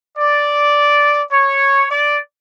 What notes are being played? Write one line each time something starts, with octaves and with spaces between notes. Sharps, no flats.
D5
C#5
D5